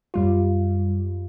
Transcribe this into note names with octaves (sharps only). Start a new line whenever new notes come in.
F#2 G3 F4